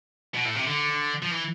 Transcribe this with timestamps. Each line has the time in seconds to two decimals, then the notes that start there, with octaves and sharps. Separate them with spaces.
0.34 B2
0.45 A2
0.55 C3
0.66 D3
1.23 F3
1.31 E3